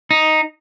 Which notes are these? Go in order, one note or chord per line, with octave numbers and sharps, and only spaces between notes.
D#4